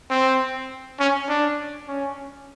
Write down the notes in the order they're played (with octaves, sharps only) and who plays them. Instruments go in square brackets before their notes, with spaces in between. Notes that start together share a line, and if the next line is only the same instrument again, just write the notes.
[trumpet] C4
C#4
D4
C#4